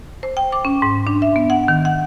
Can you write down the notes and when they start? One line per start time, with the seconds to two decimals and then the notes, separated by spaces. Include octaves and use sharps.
0.23 C5
0.37 G5
0.52 D6
0.65 C#4
0.82 G#2
1.07 D4
1.22 E5
1.36 B3
1.50 F#5
1.68 D#3
1.85 F#5